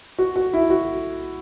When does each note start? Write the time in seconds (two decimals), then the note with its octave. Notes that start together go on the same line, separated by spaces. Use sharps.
0.18 F#4
0.36 F#4
0.53 E4
0.70 F#4